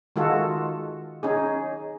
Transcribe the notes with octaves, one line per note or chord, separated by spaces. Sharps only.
D#3 G#3 F4 F#4 A4
C#4 D#4 G#4